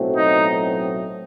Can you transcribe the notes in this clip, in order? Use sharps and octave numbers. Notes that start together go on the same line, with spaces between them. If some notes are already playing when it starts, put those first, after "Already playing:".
Already playing: B1 A2 F#3 A3 C4
D#4